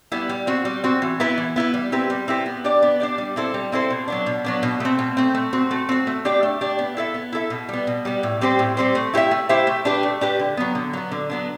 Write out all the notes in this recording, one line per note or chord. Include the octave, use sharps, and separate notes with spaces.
G3 B3 E4
G3
C4 F#4
G3
C4 F#4
E3
B3 E4 B4
E3
B3 E4 B4
G3
C4 E4 G4 B4
G3
C4 E4 G4 B4
B3
D4 G4 D5
B3
D4 G4 D5
G3
C4 E4 A4 C5
G3
C4 E4 A4 C5
B2
F#3 B3 D4
B2
F#3 B3 D4
B2
A3 C4
B2
A3 C4
A3
C4 F#4
A3
C4 F#4
A3
D4 G4 D5
A3
D4 G4 D5
B3
E4 A4 E5
B3
E4 A4 E5
B2
G3 B3
B2
G3 B3
A2
G3 C4 G4 C5
A2
G3 C4 G4 C5
A3
E4 G4 C5 E5
A3
E4 G4 C5 E5
A3
D4 G4 B4
A3
D4 G4 B4
D3
F#3 B3
D3
F#3 B3
D3
F#3 B3 D4